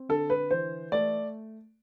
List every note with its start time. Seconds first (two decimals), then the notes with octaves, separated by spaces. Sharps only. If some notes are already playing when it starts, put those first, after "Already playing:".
Already playing: C4
0.09 D3 A4
0.30 B4
0.50 E3 C5
0.92 A3 D5